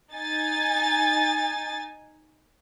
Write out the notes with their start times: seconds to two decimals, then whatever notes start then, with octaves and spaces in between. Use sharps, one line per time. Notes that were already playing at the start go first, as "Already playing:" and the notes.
0.15 D#4 G#5 A6